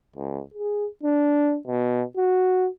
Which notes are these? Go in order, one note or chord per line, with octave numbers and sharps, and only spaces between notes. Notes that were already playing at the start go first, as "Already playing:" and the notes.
C#2
G#4
D4
B2
F#4